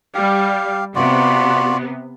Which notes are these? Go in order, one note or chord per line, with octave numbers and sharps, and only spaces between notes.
G3 G4 F5
C3 B3 F4 F#4 D5